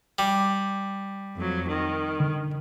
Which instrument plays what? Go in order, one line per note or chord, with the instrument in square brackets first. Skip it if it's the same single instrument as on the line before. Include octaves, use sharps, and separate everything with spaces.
[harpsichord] G3
[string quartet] F2 F#3
D#3
[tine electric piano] D3